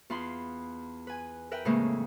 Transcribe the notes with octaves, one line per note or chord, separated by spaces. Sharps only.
E2 F4 B5 C6
B4 G#5
A#4 B4 E5 G5
F2 A2 C#3 E3 G#3 A#3